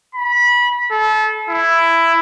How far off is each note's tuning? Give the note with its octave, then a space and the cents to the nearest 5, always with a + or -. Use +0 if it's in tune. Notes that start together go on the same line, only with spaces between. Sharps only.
B5 -25
A4 -30
E4 +10